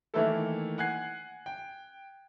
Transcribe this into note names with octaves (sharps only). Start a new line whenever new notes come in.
D#3 E3 A3 A#3 E4 A4
F#5 G#5 F#6 G#6 C7
G5